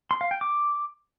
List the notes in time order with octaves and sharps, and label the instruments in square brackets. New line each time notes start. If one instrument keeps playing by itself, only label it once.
[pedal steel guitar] C6
F5
G5
D6